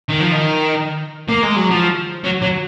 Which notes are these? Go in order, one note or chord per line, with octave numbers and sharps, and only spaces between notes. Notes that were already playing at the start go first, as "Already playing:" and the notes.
D#3
F3
D#3
A#3
G#3
F#3
F3
F#3
F#3